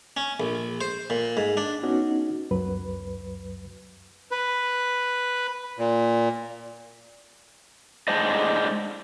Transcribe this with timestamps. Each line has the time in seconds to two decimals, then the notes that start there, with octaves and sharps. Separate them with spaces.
0.17 C#4
0.40 A#1
0.81 C5
1.10 A#2
1.37 G#2
1.57 D4
1.83 B3 C#4 D#4 F#4
2.51 C#2 F#2 F#3 B4
4.31 B4
5.79 A#2
8.08 A2 G#3 D4 C5 D#5